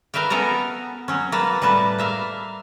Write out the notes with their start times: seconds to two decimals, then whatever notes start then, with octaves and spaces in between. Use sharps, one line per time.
0.14 A#4 B4 E5 F5 G5
0.30 B3 C#4 A4 A#4 A#5
1.08 F#3 C#4
1.32 A#3 B4 A5
1.62 A2 G3 B4 A5
1.98 A#3 E5 F5